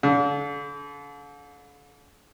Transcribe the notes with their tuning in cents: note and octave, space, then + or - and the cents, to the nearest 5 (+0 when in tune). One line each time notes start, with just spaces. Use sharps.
D3 -40